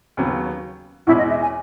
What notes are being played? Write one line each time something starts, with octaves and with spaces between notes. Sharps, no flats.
D#2 C#3 F#3 B3
E2 B2 G#3 C#4 E4
D#5
E5
G#5